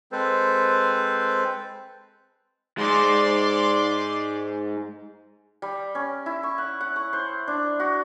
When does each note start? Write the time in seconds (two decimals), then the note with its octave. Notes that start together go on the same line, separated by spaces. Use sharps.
0.12 G#3 C4 A4 B4 C5
2.78 G#2 G#3 D5 C6 D6
5.62 G3
5.95 C#4
6.26 E4
6.43 C#6
6.58 F#5
6.81 F#5
6.96 C#6
7.13 C5
7.48 D4
7.80 F#4